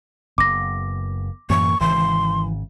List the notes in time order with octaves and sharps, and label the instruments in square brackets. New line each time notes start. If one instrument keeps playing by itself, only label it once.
[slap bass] F#1 B3 [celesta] D6 A#6
[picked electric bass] F#2 A2 E3 [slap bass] A#3 [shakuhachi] C#6
[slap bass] G#1 C#3 [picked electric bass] E3 [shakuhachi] C6